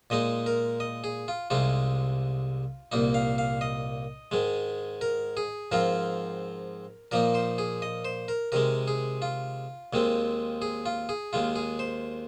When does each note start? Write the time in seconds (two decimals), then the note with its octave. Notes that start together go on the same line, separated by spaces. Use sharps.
0.10 A#2 G#3 D#4 D#5
0.46 A#4
0.80 D#5
1.04 G#4
1.28 F4
1.50 C2 C3 G#3 D#4 F4
2.92 C2 A#2 A#3 D#4
3.14 F5
3.38 F5
3.61 D#5
4.31 G#2 D#3 G#3
5.01 A#4
5.37 G#4
5.72 G#2 F3 C4 F4 A#4
7.11 A#2 F3 A#3 D#4 A#4
7.35 C5
7.58 G#4
7.82 D#5
8.05 C5
8.28 A#4
8.52 C3 D#3 G#3 A#4
8.88 G#4
9.22 F4
9.93 D#2 D#3 G#3 C4
10.62 G#4
10.86 F4
11.09 G#4
11.33 D#2 D#3 G#3 F4
11.56 G#4
11.79 C5